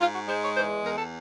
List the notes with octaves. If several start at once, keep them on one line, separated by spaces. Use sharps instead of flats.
G#2 F4
F#4
G#3 C5
C#5
E2 C5
E2 A#4
A4